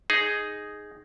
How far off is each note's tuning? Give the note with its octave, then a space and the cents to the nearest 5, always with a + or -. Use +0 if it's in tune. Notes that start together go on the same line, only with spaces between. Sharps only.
D#4 +0 G#4 +0